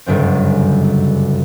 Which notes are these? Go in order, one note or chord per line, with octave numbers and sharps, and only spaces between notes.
G1 C#2 F#2 C4